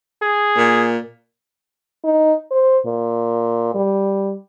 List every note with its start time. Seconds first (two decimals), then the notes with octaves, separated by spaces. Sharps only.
0.22 G#4
0.57 A#2
2.04 D#4
2.51 C5
2.86 A#2
3.75 G3